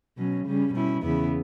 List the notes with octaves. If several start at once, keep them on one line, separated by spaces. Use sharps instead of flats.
B2 F#3 C#4
C#3 G3 C#4
B2 G3 C#4 E4
E2 C#3 E3 B3 E4